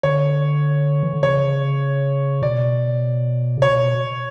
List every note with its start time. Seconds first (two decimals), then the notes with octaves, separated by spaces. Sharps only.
0.03 D3 C#5
1.03 E3
1.13 D3
1.23 C#3 C#5
2.42 B2 D5
3.57 C#3
3.62 B2 C#5